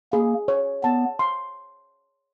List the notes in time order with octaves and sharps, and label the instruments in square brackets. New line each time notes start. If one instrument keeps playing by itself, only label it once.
[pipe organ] A#3 [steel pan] G#4
[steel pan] C#5
[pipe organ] B3 [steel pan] A5
[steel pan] C6